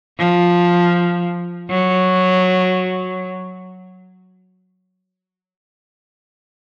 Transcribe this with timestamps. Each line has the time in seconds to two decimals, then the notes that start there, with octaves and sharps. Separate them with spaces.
0.18 F3
1.69 F#3